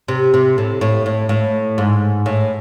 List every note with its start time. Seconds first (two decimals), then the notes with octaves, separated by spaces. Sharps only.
0.08 C3
0.34 C3
0.58 A2
0.81 A2
1.06 A2
1.29 A2
1.78 G#2
2.26 A2